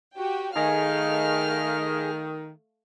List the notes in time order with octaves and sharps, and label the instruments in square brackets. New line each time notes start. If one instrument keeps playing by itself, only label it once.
[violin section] F#4 G4 G5
[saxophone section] D#3 [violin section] A3 F5 F6 [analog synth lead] G#4